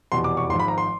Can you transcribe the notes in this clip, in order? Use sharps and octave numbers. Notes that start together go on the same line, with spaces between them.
F1 E2 B2 C6
D6
C#6
G#1 G#2 F3 C6
B5
A#5
C6